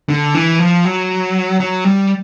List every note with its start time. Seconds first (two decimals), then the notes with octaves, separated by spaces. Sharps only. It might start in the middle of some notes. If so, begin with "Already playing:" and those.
0.09 D3
0.34 E3
0.59 F3
0.85 F#3
1.60 F#3
1.84 G3